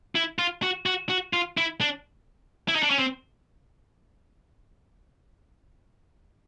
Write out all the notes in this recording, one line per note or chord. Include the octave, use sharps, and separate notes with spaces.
E4
F4
F#4
F#4
F#4
F4
E4
D4
E4
D#4
D4
C#4
C4